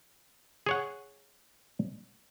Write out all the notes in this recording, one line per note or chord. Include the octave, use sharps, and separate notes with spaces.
G#4 C#5 F#5